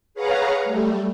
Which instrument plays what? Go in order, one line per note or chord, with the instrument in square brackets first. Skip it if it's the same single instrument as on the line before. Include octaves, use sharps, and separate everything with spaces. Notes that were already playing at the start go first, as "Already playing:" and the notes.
[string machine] G#4 B4 C#5 F5 F#5 A#5
G3 A3